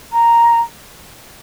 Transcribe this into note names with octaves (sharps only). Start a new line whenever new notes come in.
A#5